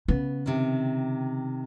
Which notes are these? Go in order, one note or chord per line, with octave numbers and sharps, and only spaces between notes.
C#3 B3
C3 D#3